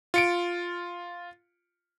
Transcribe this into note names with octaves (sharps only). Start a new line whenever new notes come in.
F4 C#7 D7